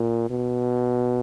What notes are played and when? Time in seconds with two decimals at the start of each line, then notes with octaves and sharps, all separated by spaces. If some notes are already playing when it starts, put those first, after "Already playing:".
Already playing: A#2
0.30 B2